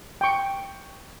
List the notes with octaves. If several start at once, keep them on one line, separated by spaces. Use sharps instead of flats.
G5 C#6